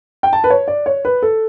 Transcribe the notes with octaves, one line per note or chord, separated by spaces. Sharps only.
G5
A5
B4
C#5
D5
C#5
B4
A4